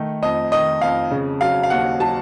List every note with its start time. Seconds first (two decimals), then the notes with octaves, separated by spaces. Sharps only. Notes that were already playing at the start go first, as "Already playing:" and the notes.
Already playing: D#3 A3
0.22 F2 D#5
0.52 D#3 D#5
0.81 F2 F5
1.11 C#3
1.41 F#3 F5
1.63 F5
1.70 D#2 F#5
2.00 F#3 A5